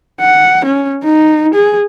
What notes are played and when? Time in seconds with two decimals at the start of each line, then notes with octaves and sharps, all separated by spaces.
0.21 F#5
0.65 C#4
1.05 D#4
1.54 G#4